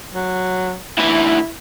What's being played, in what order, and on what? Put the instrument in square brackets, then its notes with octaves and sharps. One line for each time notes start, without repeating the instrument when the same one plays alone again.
[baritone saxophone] F#3
[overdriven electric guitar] D2 E3 [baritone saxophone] E4